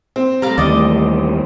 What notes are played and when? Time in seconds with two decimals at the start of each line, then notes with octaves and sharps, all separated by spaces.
0.16 C4
0.42 G3 A3 F5 A#5
0.58 D#2 E3 D5 D#5